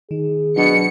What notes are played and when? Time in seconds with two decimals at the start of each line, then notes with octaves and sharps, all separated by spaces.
0.11 D#3 G#4
0.57 B2 F#3 D4 C#7